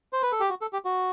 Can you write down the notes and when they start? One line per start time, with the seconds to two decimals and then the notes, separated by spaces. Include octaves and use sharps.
0.13 C5
0.23 B4
0.32 A4
0.40 G4
0.50 F#4
0.62 A4
0.73 G4
0.85 F#4